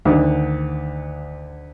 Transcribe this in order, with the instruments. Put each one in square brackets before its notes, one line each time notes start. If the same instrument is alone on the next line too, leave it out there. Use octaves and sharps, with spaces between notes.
[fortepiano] D2 D3 D#3